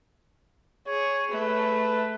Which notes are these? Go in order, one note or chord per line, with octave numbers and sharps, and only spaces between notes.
G#4 C#5
A3 B4